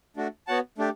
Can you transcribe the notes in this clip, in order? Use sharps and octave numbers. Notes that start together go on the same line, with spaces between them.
A3 D4 F#4
B3 F#4 C#5 F#5 A5
A3 D4 G4